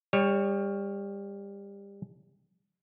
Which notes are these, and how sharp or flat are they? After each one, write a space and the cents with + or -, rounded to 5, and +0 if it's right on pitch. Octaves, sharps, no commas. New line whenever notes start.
G3 +30 C#5 +0